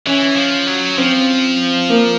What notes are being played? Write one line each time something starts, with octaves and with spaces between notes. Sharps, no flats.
E3 C#4
F3
F#3
F3 C4
A#3